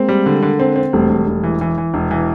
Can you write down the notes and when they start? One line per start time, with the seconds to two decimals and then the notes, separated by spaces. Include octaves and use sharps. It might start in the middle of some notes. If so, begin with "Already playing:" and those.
Already playing: G#3 A#3 C4
0.09 G3
0.26 D3
0.43 D3
0.59 C4
0.76 C4
0.93 E1 G3 A3
1.10 E1
1.27 E1
1.43 E3
1.61 E3
1.78 E3
1.94 E1
2.11 E3